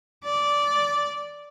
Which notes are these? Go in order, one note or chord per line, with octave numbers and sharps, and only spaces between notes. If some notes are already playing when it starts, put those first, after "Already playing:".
D5